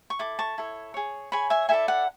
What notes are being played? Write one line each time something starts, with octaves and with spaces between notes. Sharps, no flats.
C#6
E4 A4 D6
A5 C#6
E4 A4 C#5
G#4 C#5
G#4 C#5 G#5 B5
E5 G#5
E4 A4 D5 E5 G#5
F#5